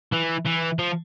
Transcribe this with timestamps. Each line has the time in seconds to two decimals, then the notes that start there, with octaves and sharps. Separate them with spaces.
0.13 E3
0.46 E3
0.79 F3